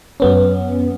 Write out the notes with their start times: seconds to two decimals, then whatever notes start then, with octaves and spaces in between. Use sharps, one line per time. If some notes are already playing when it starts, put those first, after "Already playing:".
0.20 F#2 B3 C#4